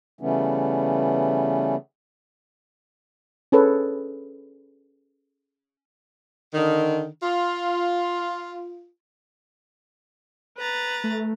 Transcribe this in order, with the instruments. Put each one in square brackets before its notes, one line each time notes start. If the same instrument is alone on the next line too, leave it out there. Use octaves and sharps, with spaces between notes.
[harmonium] C#3 E3 G3 A3 B3 C#4
[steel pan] C#4 G#4 A4 B4 C#5
[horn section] D3 D#3
F4
[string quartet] B4 A#5 A6
[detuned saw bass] A3